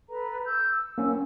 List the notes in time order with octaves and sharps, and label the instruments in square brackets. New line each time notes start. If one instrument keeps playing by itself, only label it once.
[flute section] A4 B4 A#5
E6 G6
E6
[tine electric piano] A#3 C#4